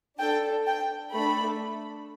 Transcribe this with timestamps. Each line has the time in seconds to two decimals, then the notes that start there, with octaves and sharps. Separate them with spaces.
0.19 D4 A4 G5
0.67 G5
1.13 A3 D4 A4 B5